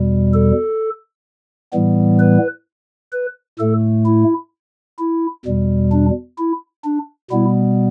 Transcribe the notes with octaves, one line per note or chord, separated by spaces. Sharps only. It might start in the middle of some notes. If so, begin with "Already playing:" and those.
Already playing: E2 B2 G3
A4
A2 E3 G3 B3
B4
B4
A2 A3 A4
E4
E4
E2 B2 G3
D4
E4
D4
B2 G3 B3 E4